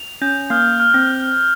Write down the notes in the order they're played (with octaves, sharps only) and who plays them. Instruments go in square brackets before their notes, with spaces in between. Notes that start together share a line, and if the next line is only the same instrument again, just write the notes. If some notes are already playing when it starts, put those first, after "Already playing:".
Already playing: [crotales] F7
[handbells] C#4 [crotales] G6
[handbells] A#3 [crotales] F6
[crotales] F6
[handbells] C4